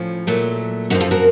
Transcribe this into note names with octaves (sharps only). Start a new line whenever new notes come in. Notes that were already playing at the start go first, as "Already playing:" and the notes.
Already playing: A2 F3 C#4
A#2 F#3 A3
F#2 F3 C4 D#4 F#4
F4 A4
F#4 A#4